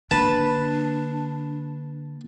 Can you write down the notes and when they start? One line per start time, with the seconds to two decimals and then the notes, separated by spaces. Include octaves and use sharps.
0.11 D3 A#3 D4 B4 A5